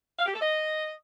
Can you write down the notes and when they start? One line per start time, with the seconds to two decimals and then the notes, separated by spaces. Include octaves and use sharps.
0.19 F5
0.26 G4
0.33 A4
0.41 D#5